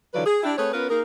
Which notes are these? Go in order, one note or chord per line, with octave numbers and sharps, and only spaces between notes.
D3 E3 F#3 F4 B4 D5
G#4
D4 E4 G4
A3 C4 G#4 B4 C#5
B3 C#4 F4 A#4 B4
A#3 D#4 G#4 A#4